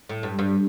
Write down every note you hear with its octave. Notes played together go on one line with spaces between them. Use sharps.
A2
G2
G2